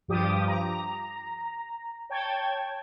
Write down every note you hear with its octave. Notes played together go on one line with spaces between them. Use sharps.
G2 F3 G4 D6 D#6
A#5
C#5 G5 A5 G#6